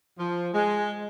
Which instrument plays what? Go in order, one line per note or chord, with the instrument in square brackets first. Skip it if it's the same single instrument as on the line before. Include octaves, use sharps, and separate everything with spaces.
[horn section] F3
G#3